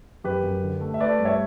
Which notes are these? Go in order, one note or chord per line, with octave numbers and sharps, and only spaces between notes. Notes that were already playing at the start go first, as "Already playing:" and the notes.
F#2 G4 B4
F#2
D3
A3
E5
A3 B4 D5
G2
C#5 E5